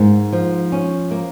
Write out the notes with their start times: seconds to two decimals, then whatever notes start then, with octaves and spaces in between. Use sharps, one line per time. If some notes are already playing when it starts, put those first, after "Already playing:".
Already playing: G#2 A#3
0.32 F3
0.72 C#4
1.11 A#3